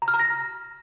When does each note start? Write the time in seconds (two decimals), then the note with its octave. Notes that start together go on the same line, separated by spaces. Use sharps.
0.02 A#5
0.08 F6
0.14 A#5
0.19 A#6